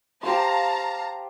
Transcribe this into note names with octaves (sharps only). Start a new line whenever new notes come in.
G4 C5 F5 A5 A#5 C6